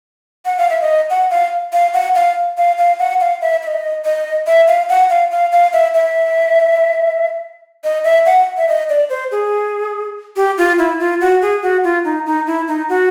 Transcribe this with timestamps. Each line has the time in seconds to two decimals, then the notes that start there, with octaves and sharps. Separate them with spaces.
0.45 F#5
0.58 F5
0.70 E5
0.81 D#5
1.10 F#5
1.31 F5
1.73 F5
1.94 F#5
2.15 F5
2.58 F5
2.78 F5
2.99 F#5
3.20 F5
3.41 E5
3.63 E5
3.67 D#5
4.05 D#5
4.47 E5
4.68 F5
4.89 F#5
5.10 F5
5.31 F5
5.52 F5
5.73 E5
5.95 E5
7.84 D#5
8.04 E5
8.26 F#5
8.57 E5
8.69 D#5
8.89 D5
9.10 C5
9.32 G#4
10.36 G4
10.58 F4
10.78 E4
11.00 F4
11.21 F#4
11.42 G#4
11.62 F#4
11.84 F4
12.05 D#4
12.26 D#4
12.47 E4
12.68 D#4
12.89 F#4